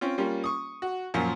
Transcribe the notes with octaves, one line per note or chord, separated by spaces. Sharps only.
C4 C#4 F4
G3 A#3 C#4 F4
C#6 D#6
F#4
F#2 A#2 F3